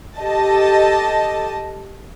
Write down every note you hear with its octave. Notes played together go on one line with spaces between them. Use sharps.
G4 A4 D#5 A5